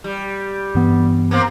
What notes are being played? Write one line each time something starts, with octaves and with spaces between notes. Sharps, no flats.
G3
G2 E3 B3
A#3 C4